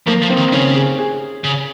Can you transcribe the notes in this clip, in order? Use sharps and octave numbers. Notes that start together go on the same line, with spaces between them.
F3 A#3
F3
C4
D#3
C#3 C#4
G#4
G#4
C#3